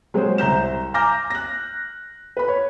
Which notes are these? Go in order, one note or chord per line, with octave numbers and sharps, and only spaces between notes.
F#3 G#3 C4 G#4 C5
C2 C5 A#5 G6 E7
G#5 A#5 D6 F6 G6 A#6
F#6 A#6
B4 B5
C#5